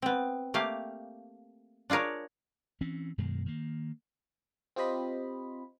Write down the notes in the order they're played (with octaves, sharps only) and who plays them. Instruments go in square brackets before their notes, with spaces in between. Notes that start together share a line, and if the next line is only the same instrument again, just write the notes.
[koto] B3 C4
A3 A#3 G4 F5
D4 F4 G#4 A#4 C#5
[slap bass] E3 C4 C#4
F#2 B2 D#3 G#3
D#3 A#3
[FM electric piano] C4 F4 G4 C5 D#5 B5